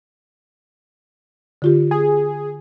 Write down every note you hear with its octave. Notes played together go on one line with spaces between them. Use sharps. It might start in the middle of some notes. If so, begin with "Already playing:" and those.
D3 F4 G4
G#4